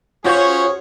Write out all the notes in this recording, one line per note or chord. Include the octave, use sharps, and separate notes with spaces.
C#4 F4 F#4 G#4 C5 C#5